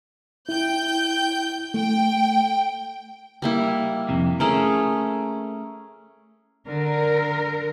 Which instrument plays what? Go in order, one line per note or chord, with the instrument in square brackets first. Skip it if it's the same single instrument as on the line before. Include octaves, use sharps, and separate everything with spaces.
[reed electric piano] E4 [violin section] G5 G6
[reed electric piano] A3 [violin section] G5
[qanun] G3 A#3 E4
[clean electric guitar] F2 C3
[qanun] A3 C#4 G#4 [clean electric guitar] A#4
[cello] D3 [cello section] A#4